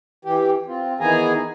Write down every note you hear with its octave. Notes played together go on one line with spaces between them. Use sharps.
E3 G4
C4 F4
D#3 E3 B3 G#4 G#5 A#5